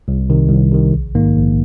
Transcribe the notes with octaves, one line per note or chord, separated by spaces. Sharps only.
C2
C3 D#3
C2
C3 D#3
A#1
G#2 D#3 A#3
A#1